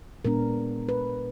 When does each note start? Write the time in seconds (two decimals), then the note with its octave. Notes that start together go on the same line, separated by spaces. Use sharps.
0.25 A#2 G#3 B3 D4 A#4
0.89 B4